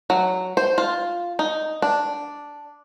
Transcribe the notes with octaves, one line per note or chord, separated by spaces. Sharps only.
F#3
C5
F4
D#4
D4